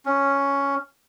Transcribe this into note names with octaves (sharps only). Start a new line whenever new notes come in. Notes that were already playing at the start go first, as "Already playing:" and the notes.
C#4